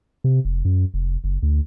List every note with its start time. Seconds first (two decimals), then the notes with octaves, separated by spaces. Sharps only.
0.24 C3
0.45 F1
0.65 F#2
0.94 F1
1.24 F#1
1.43 D2